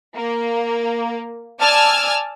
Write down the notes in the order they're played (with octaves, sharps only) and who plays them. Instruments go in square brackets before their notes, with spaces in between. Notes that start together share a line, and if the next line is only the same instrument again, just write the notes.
[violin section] A#3
D5 G#5 A5 E6 F6 G#6